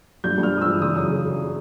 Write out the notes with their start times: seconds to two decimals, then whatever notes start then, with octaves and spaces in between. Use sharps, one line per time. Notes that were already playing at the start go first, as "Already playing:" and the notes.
0.24 G2 G6
0.38 G2
0.43 F6
0.53 G#3 D#6
0.61 E3 E6
0.81 C#3 D#6
0.95 F#2
1.10 C#3
1.25 C#3